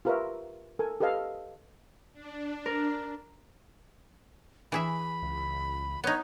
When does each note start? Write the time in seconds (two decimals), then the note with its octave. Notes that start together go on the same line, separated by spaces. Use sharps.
0.05 F4 G4 A#4 B4 C#5 E5
0.79 A4 A#4 G#5
1.00 G4 A4 B4 D#5 F5
2.13 D4
2.66 A#4
4.72 E3 G#4 E5 B5
5.23 C#2
6.04 B3 D#4 C#5